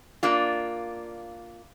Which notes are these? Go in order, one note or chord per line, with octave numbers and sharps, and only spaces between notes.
A#3 D4 F4